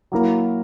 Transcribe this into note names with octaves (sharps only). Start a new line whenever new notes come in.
F#3 A#3 E4 A#4